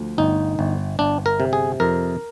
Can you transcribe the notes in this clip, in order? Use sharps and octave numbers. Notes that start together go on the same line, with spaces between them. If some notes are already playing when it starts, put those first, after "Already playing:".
Already playing: D2 F3
G1 D#4
G1
G1 D4
A#4
C3
G#4
F2 A#4